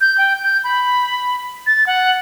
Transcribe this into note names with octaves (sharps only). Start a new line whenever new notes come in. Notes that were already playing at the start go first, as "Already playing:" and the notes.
G6
G5
G6
B5
A6
F#5